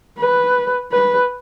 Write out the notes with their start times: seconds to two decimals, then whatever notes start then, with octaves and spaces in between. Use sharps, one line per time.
0.19 B4
0.92 B4